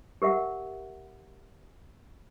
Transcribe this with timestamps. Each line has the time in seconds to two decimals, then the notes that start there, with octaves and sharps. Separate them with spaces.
0.22 G4 A#4 E5 F#5